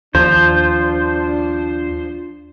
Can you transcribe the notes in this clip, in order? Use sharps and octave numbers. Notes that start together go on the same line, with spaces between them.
D#2 F3 D4 C5